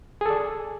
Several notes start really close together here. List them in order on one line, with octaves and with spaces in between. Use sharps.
G#4 A4 D5